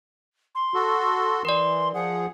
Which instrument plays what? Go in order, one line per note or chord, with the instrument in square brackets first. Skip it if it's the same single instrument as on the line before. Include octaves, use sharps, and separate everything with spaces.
[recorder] C6
[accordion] F#4 A4
[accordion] E3 [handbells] A#4 D5 [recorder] C6
[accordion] F3 G#4 [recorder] F#5